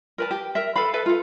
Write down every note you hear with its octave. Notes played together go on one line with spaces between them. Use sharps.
A#4 B4 A5
G4
A#4 E5
A4 B4 F5 B5
A4 B4 E5
F4 A4